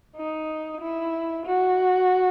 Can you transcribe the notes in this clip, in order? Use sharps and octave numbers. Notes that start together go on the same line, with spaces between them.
D#4
E4
F#4